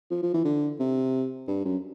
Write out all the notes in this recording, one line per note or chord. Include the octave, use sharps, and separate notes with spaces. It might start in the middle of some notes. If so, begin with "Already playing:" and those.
F3
F3
E3
D3
C3
G2
F#2